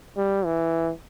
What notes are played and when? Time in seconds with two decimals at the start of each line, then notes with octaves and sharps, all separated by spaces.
0.17 G3
0.45 E3